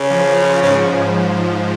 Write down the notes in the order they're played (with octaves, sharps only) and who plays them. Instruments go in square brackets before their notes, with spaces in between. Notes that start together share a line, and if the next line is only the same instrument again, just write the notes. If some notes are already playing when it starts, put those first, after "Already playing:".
Already playing: [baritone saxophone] C#3
[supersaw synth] F3
[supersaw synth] G#2 [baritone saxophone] C#3